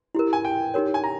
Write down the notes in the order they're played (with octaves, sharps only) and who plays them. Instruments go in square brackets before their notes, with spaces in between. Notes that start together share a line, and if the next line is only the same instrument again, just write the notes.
[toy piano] E4 G4 A#4
[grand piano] G#5
G5
[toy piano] D#4 G4 A#4 C#5
[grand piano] G#5
A#5